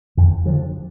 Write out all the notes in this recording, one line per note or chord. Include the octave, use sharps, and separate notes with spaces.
F2 D#3
D3 F3